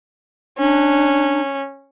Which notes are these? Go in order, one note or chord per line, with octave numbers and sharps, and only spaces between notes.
C#4 D4